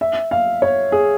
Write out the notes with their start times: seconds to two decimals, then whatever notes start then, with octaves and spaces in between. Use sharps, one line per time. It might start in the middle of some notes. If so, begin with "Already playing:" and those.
0.01 E5
0.31 F5
0.62 C#5
0.92 G#4